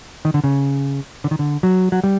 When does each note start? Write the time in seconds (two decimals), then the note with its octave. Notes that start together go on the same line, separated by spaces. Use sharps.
0.25 D#3
0.34 D3
0.44 C#3
1.24 D3
1.31 D#3
1.39 D3
1.63 F#3
1.92 F#3
2.04 G3